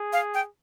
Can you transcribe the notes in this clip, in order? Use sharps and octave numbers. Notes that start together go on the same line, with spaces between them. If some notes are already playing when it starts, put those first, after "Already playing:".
Already playing: G#4
F5
G5